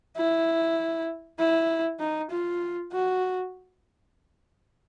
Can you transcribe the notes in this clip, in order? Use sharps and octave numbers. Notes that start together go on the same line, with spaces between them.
E4
E4
D#4
F4
F#4